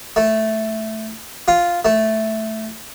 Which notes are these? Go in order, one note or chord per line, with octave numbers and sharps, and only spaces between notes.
A3
F4
A3